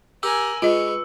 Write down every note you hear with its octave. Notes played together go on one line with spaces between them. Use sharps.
G4 A#4 G#5 E6
G#3 F4 B4 D#5 C#6